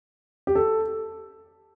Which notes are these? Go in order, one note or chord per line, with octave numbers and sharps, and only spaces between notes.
G4
A4